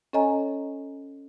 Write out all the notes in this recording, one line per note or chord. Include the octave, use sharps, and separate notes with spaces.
C#4 A4 C#5 D#5 G#5 A#5